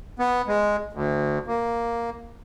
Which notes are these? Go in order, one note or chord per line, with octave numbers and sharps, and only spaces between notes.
B3
G#3
D2
A#3